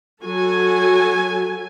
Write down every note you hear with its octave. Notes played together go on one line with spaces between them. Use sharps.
F#3 F#4 A4 G#5